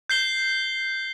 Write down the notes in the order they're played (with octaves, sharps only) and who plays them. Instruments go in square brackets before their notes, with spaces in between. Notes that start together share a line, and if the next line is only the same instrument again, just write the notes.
[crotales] G6 C7 G7